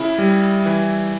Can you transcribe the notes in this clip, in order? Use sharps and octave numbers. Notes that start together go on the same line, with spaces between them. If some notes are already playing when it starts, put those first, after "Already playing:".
Already playing: C#3 E4
G3
E3